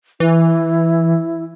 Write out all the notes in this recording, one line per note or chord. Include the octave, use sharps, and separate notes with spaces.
E3 E4